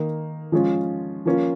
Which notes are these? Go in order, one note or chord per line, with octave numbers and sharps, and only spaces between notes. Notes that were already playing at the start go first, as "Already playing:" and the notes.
Already playing: D#3 A#3 D#4
F3 G#3 C#4 F4
F3 A#3 C#4 F4